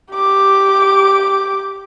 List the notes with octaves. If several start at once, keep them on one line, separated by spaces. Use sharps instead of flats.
G4 D6